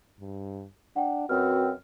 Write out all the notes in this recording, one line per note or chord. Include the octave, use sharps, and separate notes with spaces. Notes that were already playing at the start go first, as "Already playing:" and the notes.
G2
D4 F#5 G5
F#2 B2 C4 F#4 F6